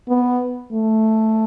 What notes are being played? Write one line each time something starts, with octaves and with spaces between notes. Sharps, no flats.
B3
A3